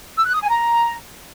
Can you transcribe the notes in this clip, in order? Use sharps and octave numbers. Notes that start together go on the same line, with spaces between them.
E6
F#6
D#6
G#5
A#5